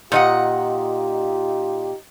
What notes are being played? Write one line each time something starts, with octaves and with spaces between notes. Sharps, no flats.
A#2 D#4 F4 G4 D#5 F#5